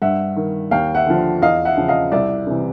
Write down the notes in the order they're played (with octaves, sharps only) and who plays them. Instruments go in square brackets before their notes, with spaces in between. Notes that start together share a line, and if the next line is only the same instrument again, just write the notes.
[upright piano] G2 E5 F#5
D#3
D#2 F5 G5
E5 F#5
D3 F3
E2 D#5 F5
E5 F#5
C#3 F3
D#5 F5
C2 D5 E5
C3 E3